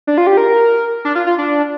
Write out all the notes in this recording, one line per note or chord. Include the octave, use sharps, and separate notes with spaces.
D4
F4
G4
A#4
D4
F4
F4
D4